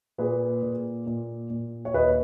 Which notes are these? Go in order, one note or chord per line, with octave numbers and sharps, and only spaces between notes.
A#2 G#4 B4
A#2
A#2
A#2
C#5
D#2 B4 D#5